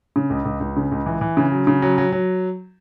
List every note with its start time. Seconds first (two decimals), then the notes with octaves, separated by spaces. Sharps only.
0.16 C#3
0.30 C#2
0.45 C#2
0.60 C#2
0.77 C#3
0.92 C#2
1.06 E3
1.21 E3
1.37 C#3
1.52 F#3
1.67 C#3
1.82 F#3
1.98 F#3
2.12 F#3